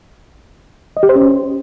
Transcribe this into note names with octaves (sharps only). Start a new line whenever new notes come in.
D#5
G4
C5
C#4